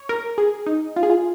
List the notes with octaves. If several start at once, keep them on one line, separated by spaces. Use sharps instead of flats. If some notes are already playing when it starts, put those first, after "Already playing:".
Already playing: C#5
A#4
G#4
D#4
F4
G#4
F4